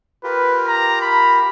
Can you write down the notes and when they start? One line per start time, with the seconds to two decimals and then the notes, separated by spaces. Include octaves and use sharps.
0.24 F4 G4 A#4 B4
0.67 A#5
1.01 B5